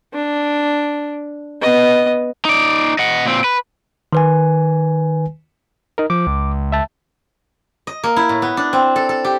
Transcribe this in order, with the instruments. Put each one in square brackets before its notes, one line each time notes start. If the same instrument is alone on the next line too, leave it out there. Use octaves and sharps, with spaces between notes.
[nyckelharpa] D4
B3 D#5
[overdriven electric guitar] D#4 D5
D#5 F#5
A#2 C4
B4
[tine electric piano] D#3 B4 G#5
[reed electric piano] D#4 A#4
[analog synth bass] F3 [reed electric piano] D6
[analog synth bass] C#2
[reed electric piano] E5 A5
[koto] D#5
A#3
E4
A2
B3
D4
C4
A4
A4
G4